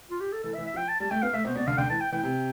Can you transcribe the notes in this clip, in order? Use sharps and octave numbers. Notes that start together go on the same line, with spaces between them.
F4
G4
A4
E3 A4
E5
E3
E5
F3
G5
A5
G3 A5
A3 G5
B3 F5
A3 E5
B2 C5
B2 D5
D3 F5
D3 G5
E3 A5
G5
E3 G5
C3